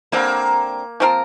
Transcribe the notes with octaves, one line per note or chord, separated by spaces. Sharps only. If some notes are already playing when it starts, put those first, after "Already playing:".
D3 G3 A#3 C4
F3 C4 F4 A#4